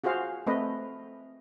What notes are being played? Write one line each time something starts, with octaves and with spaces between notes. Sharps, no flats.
F4 F#4 G#4 C5 F5
A3 C4 B4 D#5